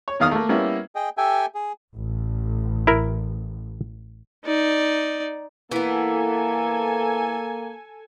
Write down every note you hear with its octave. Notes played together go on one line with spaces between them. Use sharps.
C#5
E2 D#3 F5 D#6 F6
A3 A#3
G3 A#3 B3 C#4 E4
G#4 D#5 G5
G4 A4 E5 G5 G#5
G#4
A1
E4 A#4
D#4 D5
E3 A#3 B3 A4 G#5